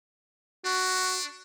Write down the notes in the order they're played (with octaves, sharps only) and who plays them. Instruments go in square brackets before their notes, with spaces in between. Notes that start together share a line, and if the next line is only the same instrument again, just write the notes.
[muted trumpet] D4 [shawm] F#4